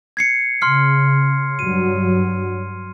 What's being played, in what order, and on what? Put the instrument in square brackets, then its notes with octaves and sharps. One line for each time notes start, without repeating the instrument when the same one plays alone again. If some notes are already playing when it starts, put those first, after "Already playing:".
[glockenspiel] G#6 C7 C#7
[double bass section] C#3 [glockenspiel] C6 F6 C7
[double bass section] G2 F#3 [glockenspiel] D#7